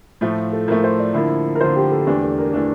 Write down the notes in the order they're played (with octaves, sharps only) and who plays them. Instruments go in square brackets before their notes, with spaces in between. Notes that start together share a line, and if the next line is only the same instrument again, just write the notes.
[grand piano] A2 F3 A3 [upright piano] F4
[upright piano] A4
[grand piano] A2 F3 A3 [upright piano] A#4
[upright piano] C5
D5
[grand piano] D3 F3 A#3 [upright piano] E4
[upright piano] A#4
[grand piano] D3 F3 A#3 [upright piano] C5
[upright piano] G4
A4
[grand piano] E2 E3 A3 D4 [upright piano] G4
[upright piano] A4
A#4
A4
[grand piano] E3 A3 D4 [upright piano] A#4